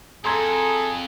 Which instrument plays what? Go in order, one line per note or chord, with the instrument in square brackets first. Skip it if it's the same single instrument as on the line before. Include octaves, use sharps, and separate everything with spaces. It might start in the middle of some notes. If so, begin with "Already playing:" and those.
[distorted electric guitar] F2 [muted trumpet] G#4 [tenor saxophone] A4 [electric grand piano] A#5 C6 G#6